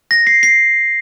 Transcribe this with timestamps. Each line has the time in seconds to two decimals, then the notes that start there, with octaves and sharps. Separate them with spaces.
0.11 A#6
0.27 C7
0.43 C7